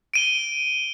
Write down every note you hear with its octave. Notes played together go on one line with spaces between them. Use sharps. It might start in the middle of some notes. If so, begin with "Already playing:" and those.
D7 D#7 G7